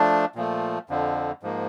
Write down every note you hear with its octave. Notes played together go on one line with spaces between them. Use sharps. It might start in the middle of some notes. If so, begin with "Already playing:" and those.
Already playing: F3 A3 D4
A#2 F3 A3
F2 D3 F3
G#2 F3 A#3